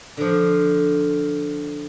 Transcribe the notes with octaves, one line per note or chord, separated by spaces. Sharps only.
D3 F3